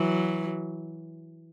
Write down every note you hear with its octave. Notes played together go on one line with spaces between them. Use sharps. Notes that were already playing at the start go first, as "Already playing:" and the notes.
Already playing: E3 F#3